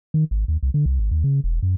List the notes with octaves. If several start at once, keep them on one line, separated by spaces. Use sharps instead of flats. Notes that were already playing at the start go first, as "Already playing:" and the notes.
D#3
G#1
D#2
C2
D3
C2
G#1
D#2
C#3
E1
F#2